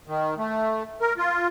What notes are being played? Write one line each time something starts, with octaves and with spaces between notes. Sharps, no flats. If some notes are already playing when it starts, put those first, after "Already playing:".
D#3
A3
A#4
F4